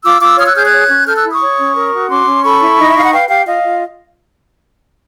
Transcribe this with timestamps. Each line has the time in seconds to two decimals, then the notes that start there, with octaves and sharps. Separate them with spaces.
0.04 F4 D6 E6
0.21 F4 D6 E6
0.38 C#5 D#6 F6
0.47 E6 F#6
0.56 G#4 F6 G6
0.63 F#6 G#6
0.72 C#5
0.90 C#4
1.07 A4 F6 G6
1.15 E6 F#6
1.24 E4
1.32 C#6 D#6
1.41 C#5
1.58 C#4
1.76 A#4
1.93 F#4
2.09 C#4 C6 D6
2.27 C#4
2.43 A4 B5 C#6
2.61 E4
2.78 D#4 D#5
2.90 E5
2.95 D#4 F5
3.05 F#5
3.12 B4 F5 G5
3.29 G4 F5 G5
3.46 F4 D#5 F5
3.63 F4